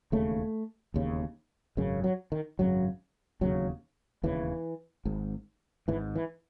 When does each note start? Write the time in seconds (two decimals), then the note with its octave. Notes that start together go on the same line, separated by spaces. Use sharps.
0.12 E1 D#2 C#3 A3
0.94 E1 D#2 C#3
1.77 G#1 F#2 C#3
2.04 F#3
2.32 D#3
2.59 G#1 F#2 C#3 F#3
3.41 E1 D#2 C#3 F#3
4.23 E1 D#2 C#3 E3
5.05 G#1 G#2
5.88 G#1 G#2 E3
6.15 E3